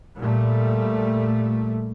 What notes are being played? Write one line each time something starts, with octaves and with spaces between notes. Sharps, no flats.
A#2 G3 A3